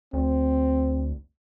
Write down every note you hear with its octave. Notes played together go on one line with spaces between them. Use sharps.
D2 C4